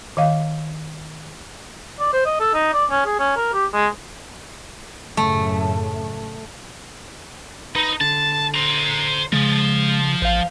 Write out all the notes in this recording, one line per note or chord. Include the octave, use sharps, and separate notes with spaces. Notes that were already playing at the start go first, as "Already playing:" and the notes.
D#3 D#5 F5
D5
C5
D#5
A4
D#4
D5
C#4
G#4
C#4
A#4
G4
G#3
F#2 A2 C#3 A3
D#4 B4
D3 A5
C5 A#5
C#3 F3 G#3
A1 C5 F5